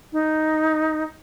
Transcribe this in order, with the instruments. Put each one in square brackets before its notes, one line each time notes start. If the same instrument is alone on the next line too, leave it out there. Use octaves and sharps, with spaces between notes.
[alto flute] D#4